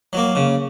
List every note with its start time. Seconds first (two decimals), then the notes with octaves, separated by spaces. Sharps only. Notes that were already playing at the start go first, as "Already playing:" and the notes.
0.13 F#3 A#3
0.35 C#3